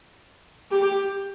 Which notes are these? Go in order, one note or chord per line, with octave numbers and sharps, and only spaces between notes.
G4